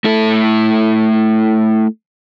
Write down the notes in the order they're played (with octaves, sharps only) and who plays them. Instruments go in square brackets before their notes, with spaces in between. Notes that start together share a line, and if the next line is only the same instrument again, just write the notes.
[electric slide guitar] A3 E4 A4